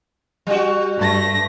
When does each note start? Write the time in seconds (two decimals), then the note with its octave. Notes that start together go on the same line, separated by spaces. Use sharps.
0.47 G3 F#4
0.97 G2 A3 A#6